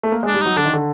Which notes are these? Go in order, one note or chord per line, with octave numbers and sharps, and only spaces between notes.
A3
A#3
G#3
D4
G3
F#3 D#4
D3 D4
D#3
D3